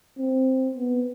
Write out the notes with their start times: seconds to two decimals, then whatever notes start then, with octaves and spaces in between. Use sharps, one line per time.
0.18 C4
0.75 B3